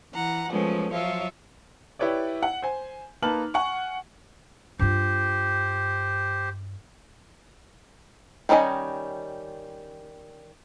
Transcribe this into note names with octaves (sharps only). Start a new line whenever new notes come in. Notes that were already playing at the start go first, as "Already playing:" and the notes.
E3 F#5 A#5
F3 F#3 G#3 A3 B3 C#4
F3 F#3 F4 C#5 E5 F5
E4 G4 B4 C#5 D5
F#5
C5 G#5
A#3 D#4 B4 A5 F6 F#7
F#5 G#5 C#6
G2 F4 G4 C5
D#3 G3 C#4 D#5 G#5